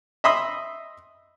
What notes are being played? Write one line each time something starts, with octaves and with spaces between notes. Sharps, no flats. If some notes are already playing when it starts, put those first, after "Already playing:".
D#5 E5 B5 C6 D#6